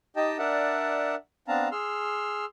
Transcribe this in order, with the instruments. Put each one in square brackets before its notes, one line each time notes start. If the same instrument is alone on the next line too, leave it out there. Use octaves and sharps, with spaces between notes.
[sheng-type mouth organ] D#4 G4 D#5 G5 A5
D4 A#4 D5 E5 F#5 A5
B3 C4 D4 F5 A5 A#5
G#4 C6 E6 F6